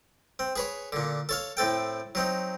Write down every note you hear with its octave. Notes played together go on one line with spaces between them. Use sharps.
C4
G#4 B4 C#5
A#2 D3
A4 C#5 F5
A2 C4 A4 G5
F#3 C4 D#4